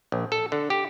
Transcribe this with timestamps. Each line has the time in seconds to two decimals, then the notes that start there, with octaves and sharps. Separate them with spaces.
0.12 A#1
0.32 A4
0.52 D3
0.70 G4